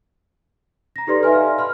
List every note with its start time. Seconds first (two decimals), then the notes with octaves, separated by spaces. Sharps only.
0.96 A#5 A#6
1.07 D#4 G4 A4 B4 D5 C6
1.23 D#5 E5 G#5 F6
1.35 F5
1.59 B5 C6 F6